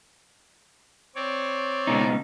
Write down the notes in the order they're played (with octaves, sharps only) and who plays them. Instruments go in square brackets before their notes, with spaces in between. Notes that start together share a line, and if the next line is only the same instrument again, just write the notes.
[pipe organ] C4 C#5 D5
[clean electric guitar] C#2 B2 D#4